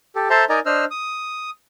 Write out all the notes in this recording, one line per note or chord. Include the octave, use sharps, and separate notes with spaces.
G4 A4
A4 C5 E5 A5 A#5 C6
D#4 A#4 D5 D#5 G#5 A#5
D4 C5 D#5 E6 F6
D#6